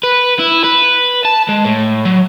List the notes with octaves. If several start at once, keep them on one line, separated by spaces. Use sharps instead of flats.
B4
E4
B4
A5
G#3
A2
F#3